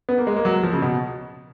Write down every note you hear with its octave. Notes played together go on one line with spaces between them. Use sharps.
B3
A#3
G#3
A#3
F#3
F3
C#3
B2